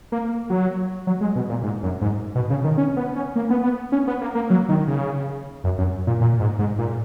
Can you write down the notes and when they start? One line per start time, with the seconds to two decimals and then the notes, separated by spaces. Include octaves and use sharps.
0.12 A#3
0.50 F#3
1.07 F#3
1.21 G#3
1.36 B2
1.49 A#2
1.63 G#2
1.83 F#2
2.02 G#2
2.35 B2
2.50 C#3
2.64 D#3
2.78 C#4
2.97 B3
3.16 C#4
3.36 A#3
3.50 B3
3.63 B3
3.92 C#4
4.07 B3
4.21 A#3
4.35 A#3
4.50 F#3
4.69 D#3
4.87 C#3
5.64 F#2
5.78 F#2
6.07 A#2
6.21 A#2
6.40 G#2
6.59 G#2
6.78 A#2